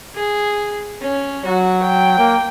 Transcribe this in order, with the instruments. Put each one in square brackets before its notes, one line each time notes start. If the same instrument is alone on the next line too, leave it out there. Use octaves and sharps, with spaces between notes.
[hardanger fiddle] G#4
C#4
[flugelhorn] F#3 [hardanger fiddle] F#4
[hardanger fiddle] G5
[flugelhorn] A#3